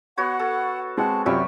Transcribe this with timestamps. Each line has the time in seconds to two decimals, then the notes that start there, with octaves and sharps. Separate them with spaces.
0.18 B3 F#4 C#5 F#5
0.39 A4
0.98 G#3 C4 F#5 A5
1.26 F#2 C3 G3 F4 C#5 E5 C#6